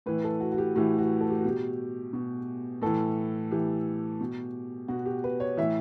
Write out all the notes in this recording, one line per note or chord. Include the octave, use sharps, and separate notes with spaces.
A2 E3 B4
A4
F#4
F#4
G4
A2 E3 G4
F#4
A4
G4
F#4
B2 G4
B2
A2 E3 A4
A2 E3 G4
B2
B2 F#4
G4
B4
C#5
A2 E3 E5